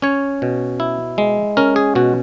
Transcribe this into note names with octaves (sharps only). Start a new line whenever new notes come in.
C#4 C#5
B2
E4
G#3
C#4 A#4
G#4
B2 F#4